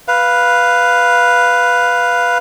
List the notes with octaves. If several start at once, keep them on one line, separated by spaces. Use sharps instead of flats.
B4 F5